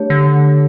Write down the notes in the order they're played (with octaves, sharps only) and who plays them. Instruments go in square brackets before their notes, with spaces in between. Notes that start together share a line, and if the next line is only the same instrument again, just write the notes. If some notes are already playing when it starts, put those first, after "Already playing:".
Already playing: [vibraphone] A3 D4 G4 C#5
[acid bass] D3